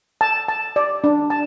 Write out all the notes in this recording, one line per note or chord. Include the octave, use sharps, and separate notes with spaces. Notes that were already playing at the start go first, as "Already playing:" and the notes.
A5
A5
D5
D4
A5